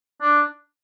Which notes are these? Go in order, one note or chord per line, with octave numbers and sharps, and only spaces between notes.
D4